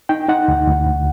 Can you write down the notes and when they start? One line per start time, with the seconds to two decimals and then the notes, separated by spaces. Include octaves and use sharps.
0.09 D#4 G5
0.28 D#4 F#5
0.48 D2
0.67 D2
0.86 D2